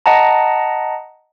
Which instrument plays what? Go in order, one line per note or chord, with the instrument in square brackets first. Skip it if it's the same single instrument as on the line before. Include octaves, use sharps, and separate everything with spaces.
[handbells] D#5 F#5 A5 A#5